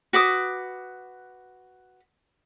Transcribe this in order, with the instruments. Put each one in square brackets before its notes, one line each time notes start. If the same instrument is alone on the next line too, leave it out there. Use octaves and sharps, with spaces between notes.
[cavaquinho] F#4 B4 D6 D#6